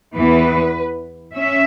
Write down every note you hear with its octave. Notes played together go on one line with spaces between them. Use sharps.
E2 E3 B3 B4
C#4 E5